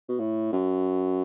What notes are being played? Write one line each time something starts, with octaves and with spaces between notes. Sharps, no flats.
B2
A2
F#2